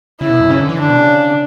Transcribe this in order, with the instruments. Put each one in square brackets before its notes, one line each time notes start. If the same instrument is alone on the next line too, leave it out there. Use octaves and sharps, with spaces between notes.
[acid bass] C#3 [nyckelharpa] E4
[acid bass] B2
F#2
[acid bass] C#3 [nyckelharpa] C#4
[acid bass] D3
E3
[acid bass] D3 [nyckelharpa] D4
[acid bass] B2
C#3